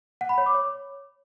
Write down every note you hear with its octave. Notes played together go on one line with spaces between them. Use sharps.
F#5
B5
C#5
D6
C#5